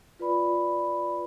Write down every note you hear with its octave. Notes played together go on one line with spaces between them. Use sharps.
F4 B4 D5 B5